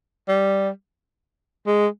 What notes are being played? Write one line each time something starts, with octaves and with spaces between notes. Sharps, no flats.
G3
G#3